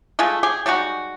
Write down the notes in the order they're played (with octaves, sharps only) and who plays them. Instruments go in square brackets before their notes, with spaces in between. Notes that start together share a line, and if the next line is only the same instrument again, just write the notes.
[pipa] G#3 A3 F4 G#4
G4 G#4
G3 G#3 D#4 F#4